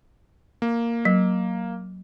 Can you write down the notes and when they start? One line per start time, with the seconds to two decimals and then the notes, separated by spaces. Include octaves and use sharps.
0.62 A#3
1.05 F#3